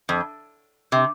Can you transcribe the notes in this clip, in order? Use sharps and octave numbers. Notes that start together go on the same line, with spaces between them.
F2
C3